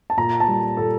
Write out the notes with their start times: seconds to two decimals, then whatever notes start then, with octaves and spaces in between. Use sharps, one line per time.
0.10 A5
0.17 A#2 A#5
0.40 A5
0.48 G3
0.77 A#2 A4